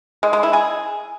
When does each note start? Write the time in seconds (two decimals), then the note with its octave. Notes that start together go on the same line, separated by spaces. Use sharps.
0.23 G#3
0.33 G#3
0.43 E4
0.53 G#4